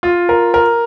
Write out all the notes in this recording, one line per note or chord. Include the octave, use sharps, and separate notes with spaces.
F4
A#4
A#4